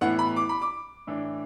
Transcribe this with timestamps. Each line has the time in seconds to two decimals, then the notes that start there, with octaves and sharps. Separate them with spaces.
0.01 A2 E3 B3 F#5
0.19 B5
0.36 D6
0.49 B5
0.62 D6
1.07 A2 E3 D4